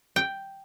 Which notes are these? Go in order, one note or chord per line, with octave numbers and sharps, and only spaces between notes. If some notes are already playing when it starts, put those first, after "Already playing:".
G5